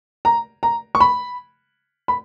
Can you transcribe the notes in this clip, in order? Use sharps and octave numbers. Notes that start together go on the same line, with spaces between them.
A#5
A#5
C#6
B5
B5